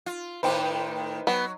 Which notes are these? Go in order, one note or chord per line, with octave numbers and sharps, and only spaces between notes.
F4
A2 D#3 D#4 B4 C5 G5
F#3 B3